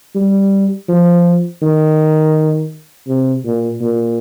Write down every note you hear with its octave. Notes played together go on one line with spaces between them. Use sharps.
G3
F3
D#3
C3
A#2
A#2